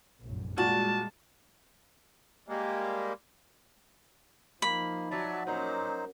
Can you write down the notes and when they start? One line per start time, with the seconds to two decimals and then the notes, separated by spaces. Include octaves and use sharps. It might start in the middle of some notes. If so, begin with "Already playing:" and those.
0.21 F1 A#1 F#2
0.58 A#2 G3 G#3 F#4 A5
2.48 G3 G#3 A#3
4.62 F3 A#3 D#4 B5
5.11 F#3 D5 E5 A5
5.47 A#2 F#3 C#4 D#4 C5